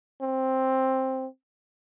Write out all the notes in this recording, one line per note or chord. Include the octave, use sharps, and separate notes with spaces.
C4